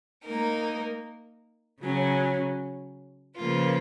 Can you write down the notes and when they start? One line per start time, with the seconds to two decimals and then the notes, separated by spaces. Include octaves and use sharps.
0.24 A#3 D#4 A#4
1.81 C#3 F#3 C#4
3.37 C#3 F3 A#3 F4 B4